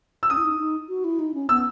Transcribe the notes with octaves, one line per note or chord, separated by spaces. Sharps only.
E6
C#4 D#6
E4
D#4
D#4
F#4
E4
D#4
C#4
B3 E6